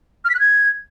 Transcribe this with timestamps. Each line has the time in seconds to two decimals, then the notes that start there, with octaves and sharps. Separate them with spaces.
0.24 F6
0.29 B6
0.34 F#6
0.39 G#6